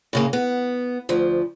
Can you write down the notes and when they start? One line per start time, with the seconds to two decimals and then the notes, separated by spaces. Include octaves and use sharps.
0.13 A2 C#3 A#3
0.33 B3
1.09 D2 F3